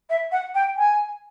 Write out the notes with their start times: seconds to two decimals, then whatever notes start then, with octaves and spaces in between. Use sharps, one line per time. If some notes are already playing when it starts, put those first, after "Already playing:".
0.10 E5
0.32 F#5
0.55 G5
0.77 G#5